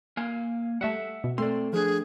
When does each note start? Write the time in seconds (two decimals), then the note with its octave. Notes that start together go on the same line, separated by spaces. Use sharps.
0.17 A#3 F5 G#5
0.81 G3 A3 E5 F#5
1.24 B2
1.38 A3 C4 D5 C6
1.73 F3 D4 G#4